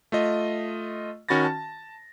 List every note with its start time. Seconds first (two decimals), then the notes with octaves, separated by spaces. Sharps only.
0.12 A3 F4 D#5
1.29 D#3 C#4 F#4 B5 A6 A#6
1.45 A5